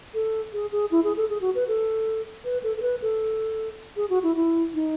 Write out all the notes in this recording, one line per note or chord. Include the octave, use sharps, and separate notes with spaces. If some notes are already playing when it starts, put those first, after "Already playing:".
A4
G#4
G#4
E4
G#4
A4
G#4
F#4
B4
A4
B4
A4
A4
B4
A4
G#4
F#4
E4
E4
D#4